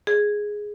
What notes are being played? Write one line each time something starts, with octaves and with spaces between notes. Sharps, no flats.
G#4